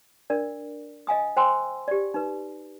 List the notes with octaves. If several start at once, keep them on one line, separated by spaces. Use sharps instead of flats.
D4 A#4 D5
D#5 F5 G#5 D#6
C5 G5 G#5 C6 E6
G4 D5
D#4 B4